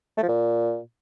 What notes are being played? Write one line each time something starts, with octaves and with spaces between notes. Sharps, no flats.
A3
F3
A#2